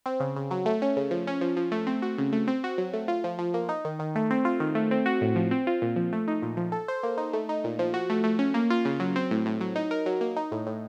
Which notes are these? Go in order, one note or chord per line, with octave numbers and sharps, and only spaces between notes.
C4
C#3
C#3
F#3
A3
C#4
C#3
F3
C#4
F3
F3
A3
C4
F#4
C#3
A3
C4
F#4
F#3
A3
F4
F3
F3
A#3
D#4
D#3
D#3
A3
C4
F4
D#3
A3
C4
F#4
A2
F3
C4
F4
A#2
F3
A3
D#4
A#2
F3
A4
C5
A#3
D#4
A3
D#4
A#2
F3
F#4
A3
A3
C#4
A#3
F4
C#3
F#3
C4
A2
A2
F#3
D#4
A#4
F#3
A#3
D#4
A2
A2